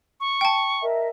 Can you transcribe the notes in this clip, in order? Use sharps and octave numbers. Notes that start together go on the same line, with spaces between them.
C#6
G5 A5
A#4 D#5 E5